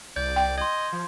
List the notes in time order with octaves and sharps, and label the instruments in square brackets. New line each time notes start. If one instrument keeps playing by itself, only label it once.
[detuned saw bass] C2 [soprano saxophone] D5 [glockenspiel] G6
[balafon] G5
[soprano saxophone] D#5 [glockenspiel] C6 G#6
[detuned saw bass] F3